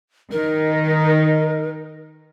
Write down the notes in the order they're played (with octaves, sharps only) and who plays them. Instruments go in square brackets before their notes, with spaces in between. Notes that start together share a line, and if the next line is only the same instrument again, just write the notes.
[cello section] D#3 D#4 [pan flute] A#4